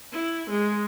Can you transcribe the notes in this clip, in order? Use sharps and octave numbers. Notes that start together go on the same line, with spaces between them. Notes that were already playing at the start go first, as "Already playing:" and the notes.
E4
G#3